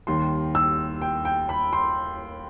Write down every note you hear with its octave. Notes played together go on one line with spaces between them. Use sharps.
D#2 D#3 G3 C6
E6
G5
G5
B5
C6